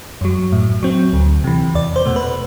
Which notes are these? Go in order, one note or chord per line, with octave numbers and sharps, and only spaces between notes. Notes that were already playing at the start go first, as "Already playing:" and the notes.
F#2 F#3
A2
F#3 C4
D2
C3 E3
E2 D5
C5
B2 A3
B4